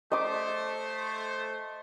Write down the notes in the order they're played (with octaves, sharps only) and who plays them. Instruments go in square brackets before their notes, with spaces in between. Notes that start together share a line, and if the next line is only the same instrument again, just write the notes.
[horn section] A3 C5 [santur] D#5 D6